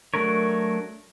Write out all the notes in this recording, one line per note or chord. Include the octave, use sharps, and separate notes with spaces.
F#3 A3 D4 A#4 C#5